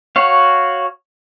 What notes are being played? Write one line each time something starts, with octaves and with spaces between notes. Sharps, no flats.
F#4 C#5 F5